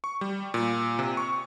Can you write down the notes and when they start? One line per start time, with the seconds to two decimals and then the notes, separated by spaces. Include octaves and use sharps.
0.04 C#6
0.21 G3
0.54 A#2
0.99 C3
1.17 C#6